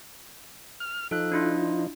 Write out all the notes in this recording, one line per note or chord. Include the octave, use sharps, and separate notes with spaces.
F6
F3 D#4 A4 F#6
D4 E4 F4